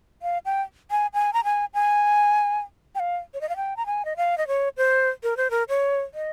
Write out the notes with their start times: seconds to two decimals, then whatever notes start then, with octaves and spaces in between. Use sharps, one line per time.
0.22 F5
0.45 G5
0.91 G#5
1.14 G#5
1.33 A#5
1.44 G#5
1.74 G#5
2.95 G5
2.99 F5
3.34 C#5
3.41 D#5
3.49 F5
3.56 G5
3.76 A#5
3.86 G#5
4.05 D#5
4.17 F5
4.38 D#5
4.47 C#5
4.77 C5
5.23 A#4
5.37 C5
5.50 A#4
5.69 C#5
6.14 D#5